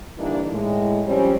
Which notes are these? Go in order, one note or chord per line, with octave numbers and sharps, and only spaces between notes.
D3 E3 G3 A#3 D4 D#4
A2 G#3
F3 G3 C4 C#4